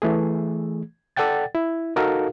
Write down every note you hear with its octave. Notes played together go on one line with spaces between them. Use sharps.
E3 A3 G#4
A4 D5 F#5 G5 A6
E4
D#4 F#4 A4 A#4 F5